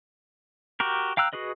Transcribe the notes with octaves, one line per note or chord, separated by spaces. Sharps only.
F#4 G4 A#4
F5 G5 A#5 E6 F#6
F#4 G#4 B4 D#5